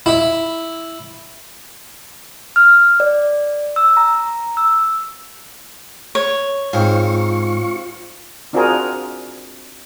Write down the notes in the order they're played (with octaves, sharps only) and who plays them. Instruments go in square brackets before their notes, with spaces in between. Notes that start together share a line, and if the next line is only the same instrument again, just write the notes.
[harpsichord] E4 E5
[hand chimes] F6
D5
E6
A#5
E6
[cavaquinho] C#5
[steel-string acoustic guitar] G#2 [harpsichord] C4 G#4 F5 [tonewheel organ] F4 C#6
[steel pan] C4 D4 F4 F#4 G#4 A#4